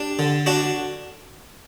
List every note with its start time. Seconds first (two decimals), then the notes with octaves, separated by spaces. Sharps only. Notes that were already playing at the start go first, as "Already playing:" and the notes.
Already playing: D4 G4
0.19 D3
0.46 D4 F#4